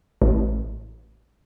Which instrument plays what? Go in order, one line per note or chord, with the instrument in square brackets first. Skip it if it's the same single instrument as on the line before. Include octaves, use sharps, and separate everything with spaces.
[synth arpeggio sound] A1